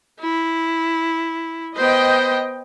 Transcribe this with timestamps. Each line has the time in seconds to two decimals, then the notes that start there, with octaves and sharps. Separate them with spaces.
0.20 E4
1.76 B3 C5 D#5 G5